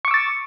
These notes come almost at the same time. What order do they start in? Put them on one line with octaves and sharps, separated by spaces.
C#6 D6 E6 A6